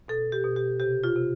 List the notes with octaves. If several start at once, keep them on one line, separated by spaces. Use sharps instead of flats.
B2 A4
G4
B2
G4
C3 G4
F4
C3